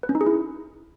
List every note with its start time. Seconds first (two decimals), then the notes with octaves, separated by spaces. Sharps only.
0.03 B4
0.09 C#4
0.15 D#4
0.21 G#4
0.27 E4